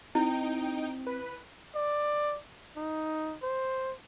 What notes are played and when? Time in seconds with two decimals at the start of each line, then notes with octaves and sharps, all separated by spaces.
0.15 C4 D#4 E4 G5
1.07 B4
1.75 D5
2.76 D#4
3.43 C5